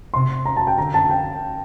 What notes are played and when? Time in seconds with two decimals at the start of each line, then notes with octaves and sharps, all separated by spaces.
0.14 C3 C6
0.46 A#5
0.57 A5
0.67 G5
0.78 D3 A#5
0.94 A5
1.10 G5